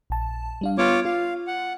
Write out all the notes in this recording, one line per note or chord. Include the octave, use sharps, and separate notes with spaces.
A#1 A5
G3 D4 F5
B3 F4 C#5 D6
F4 F5
F#5